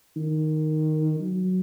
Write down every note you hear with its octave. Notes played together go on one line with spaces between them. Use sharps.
D#3
F#3